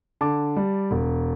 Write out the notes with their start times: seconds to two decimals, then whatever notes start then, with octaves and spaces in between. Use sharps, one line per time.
0.21 D3 A5 D6
0.56 G3
0.91 E1